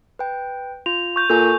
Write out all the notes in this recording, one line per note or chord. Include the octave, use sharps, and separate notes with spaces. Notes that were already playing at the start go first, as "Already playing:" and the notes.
B4 G5
F4 F7
C#6 G6
A#2 A4 G#5 G6